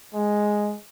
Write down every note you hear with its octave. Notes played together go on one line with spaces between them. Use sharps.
G#3